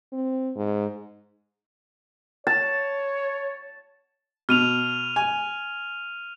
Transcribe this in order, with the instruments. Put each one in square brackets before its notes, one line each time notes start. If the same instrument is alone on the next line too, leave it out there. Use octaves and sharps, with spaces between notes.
[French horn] C4
G#2
[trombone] C#5 [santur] A5
[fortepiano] B2 [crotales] F6 D#7 F7
[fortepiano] G#5